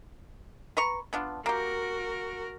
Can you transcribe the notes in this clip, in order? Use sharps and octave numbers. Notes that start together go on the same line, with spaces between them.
B4 A#5 C#6
B3 D4 F4
A#3 F#4 G4 A#4